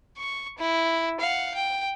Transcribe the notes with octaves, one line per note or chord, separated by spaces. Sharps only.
C#6
E4
F5 F#5
G5